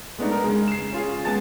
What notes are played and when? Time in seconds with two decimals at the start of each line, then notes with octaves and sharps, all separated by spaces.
0.18 G#3 A3 B3 D4 D#4
0.31 A#4
0.44 C#3 G#3
0.68 C7 E7
0.92 C#4 F4 G#4
1.25 G#3 B3 G#5 A5 A6